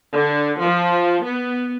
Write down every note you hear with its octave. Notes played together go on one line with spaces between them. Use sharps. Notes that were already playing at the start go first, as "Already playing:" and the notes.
D3
F3
B3